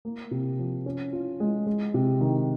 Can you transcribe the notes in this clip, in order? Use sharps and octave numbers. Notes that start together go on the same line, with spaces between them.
A#3
C3
F3
C#4
F4
G#3
G#3
C3
D#3